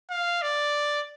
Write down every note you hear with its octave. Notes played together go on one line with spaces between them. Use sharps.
F5
D5